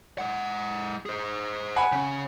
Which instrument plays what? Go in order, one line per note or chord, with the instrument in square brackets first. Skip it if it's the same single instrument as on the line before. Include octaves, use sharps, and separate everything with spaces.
[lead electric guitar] G#3 F#5
G#4 C5
[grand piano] F#5 G#5 B5
[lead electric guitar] C#3 C#4